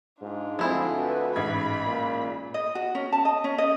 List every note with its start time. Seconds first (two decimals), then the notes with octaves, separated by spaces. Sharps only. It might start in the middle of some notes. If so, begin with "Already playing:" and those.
0.22 G#2 D4 F4
0.59 D2 F3 G#3 C4 E4 G#4
0.96 F#4 B4
1.36 A1 G#2 B5 G#6
1.86 A#2
2.54 D#5
2.75 F#4
2.95 C#4
3.13 A5
3.25 D#5
3.44 C#4
3.58 D#5